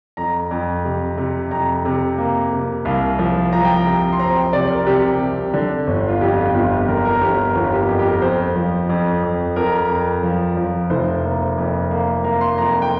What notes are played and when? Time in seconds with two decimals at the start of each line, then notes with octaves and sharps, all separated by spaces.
0.17 F2 A#5
0.51 F2
0.84 C3
1.18 C3
1.51 F2 A#5
1.85 C3
2.18 A#3
2.52 C3
2.85 C2 F5
3.19 F3
3.53 F3 A#5
3.65 G5
3.77 A#5
3.86 C3
4.13 C6
4.20 C4 A#5
4.36 G5
4.53 C3 D5
4.70 A#4
4.87 C3 G4
5.20 C3
5.54 D3
5.87 G1
6.09 F4
6.21 F2 G4
6.37 F4
6.54 G1 F4
6.71 G4
6.88 D3 A#4
7.05 A#4
7.21 G1 G4
7.38 A#4
7.55 G1 F4
7.72 G4
7.88 F2 G4
7.99 G4
8.06 A#4
8.22 F2 C5
8.56 F3
8.89 F2
9.23 F2
9.56 F2 A#4
9.90 F2
10.23 F3
10.57 F3
10.90 F1 C5
11.24 A#3
11.57 F2
11.91 A#3
12.24 A#3 A#5
12.41 C6
12.58 F2 A#5
12.82 G5